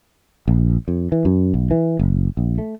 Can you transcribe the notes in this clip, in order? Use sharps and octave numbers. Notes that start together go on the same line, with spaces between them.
A#1
F2
E3
F#2
B1
E3
F#1
A#1
A3